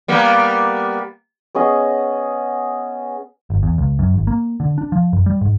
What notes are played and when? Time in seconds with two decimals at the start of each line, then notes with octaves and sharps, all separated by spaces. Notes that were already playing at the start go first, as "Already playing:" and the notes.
0.08 G3 A#3 B3
1.55 B3 C#4 G#4 D#5
3.50 G1
3.63 E2
3.78 C#2
3.99 F#2
4.14 G#1
4.27 A#3
4.60 D3
4.78 D4
4.92 F3
5.13 F#2
5.26 G3
5.41 G#2